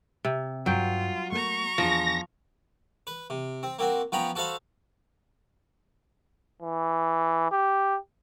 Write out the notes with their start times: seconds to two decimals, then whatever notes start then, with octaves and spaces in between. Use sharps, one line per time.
0.25 C3
0.66 G2 F#3 F4 G5
1.32 A3 A#3 A#5 C#6
1.78 E2 F3 D4 G#4 A#6
3.07 B4
3.30 C3
3.63 C4
3.79 A#3 C4 F#4
4.12 F3 B3 C#4 G5 A#5 B5
4.35 F#4 A4 C5 F5 B5
6.62 E3
7.51 G4